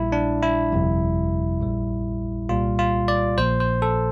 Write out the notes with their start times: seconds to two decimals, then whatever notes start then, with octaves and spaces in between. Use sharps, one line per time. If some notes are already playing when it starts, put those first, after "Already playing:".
Already playing: A#1 A#2 G3 E4
0.12 D4
0.43 E4
0.72 G1 F2 C3 G3
1.61 A#1 A#2 G3
2.49 C2 A#2 G3 F4
2.79 F4
3.08 D5
3.38 A#1 A#2 F3 C5
3.60 C5
3.82 A4